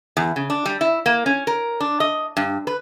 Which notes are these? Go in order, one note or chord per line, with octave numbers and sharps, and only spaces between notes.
E2
C#3
D4
G3
E4
A#3
C#4
A#4
D4
D#5
G2
B4